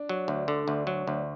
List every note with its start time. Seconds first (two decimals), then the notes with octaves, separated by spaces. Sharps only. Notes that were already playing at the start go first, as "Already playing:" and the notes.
Already playing: D4
0.09 F#3
0.28 D2
0.48 D3
0.68 D2
0.87 F#3
1.08 D2